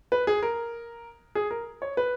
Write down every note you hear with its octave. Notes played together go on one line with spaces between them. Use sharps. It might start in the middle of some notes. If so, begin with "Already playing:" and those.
B4
G#4
A#4
G#4
A#4
C#5
B4